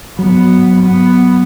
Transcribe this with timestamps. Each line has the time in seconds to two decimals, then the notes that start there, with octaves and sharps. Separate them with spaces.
0.19 F#3 B3
0.81 B3